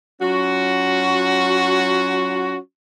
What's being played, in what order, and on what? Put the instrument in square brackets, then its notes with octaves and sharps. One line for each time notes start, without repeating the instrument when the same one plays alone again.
[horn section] F#3 C#4 F4 F#4